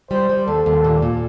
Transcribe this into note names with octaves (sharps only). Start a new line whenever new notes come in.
G3 C5
G3
D#2 A4
D#2
A#2
A#2